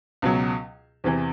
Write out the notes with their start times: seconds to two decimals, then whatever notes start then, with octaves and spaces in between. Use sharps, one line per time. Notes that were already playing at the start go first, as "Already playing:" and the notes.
0.22 C#2 B2 F#3
1.04 E2 C3 E3